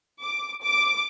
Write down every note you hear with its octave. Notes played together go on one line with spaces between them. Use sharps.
D6
D6